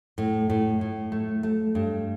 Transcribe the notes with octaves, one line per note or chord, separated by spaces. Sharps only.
A2
A2
A2
A3
A3
G2